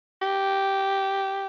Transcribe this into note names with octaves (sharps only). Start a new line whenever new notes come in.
G4